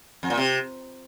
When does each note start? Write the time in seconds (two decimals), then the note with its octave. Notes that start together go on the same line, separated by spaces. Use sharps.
0.23 F2
0.30 A#2
0.37 C3